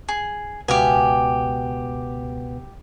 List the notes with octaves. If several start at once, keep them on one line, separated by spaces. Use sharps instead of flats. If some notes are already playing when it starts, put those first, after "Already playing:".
G#4
C#2 B2 B3 G4 F5 G#5